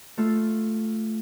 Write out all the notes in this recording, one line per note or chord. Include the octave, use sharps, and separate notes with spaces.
A3 F4 A4